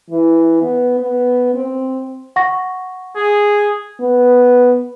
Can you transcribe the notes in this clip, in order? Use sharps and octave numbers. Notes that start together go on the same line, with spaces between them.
E3
B3
B3
C4
F#5 C#6 A#6
G#4
B3